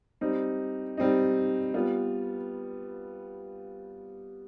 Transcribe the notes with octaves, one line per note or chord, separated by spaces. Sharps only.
G3 C4 D#4
G3 C4 D#4
G3 B3 F4